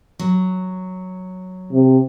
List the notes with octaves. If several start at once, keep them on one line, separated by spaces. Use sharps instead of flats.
F#3
C3